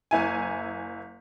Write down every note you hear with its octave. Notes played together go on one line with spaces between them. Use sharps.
F#1 E4 G#5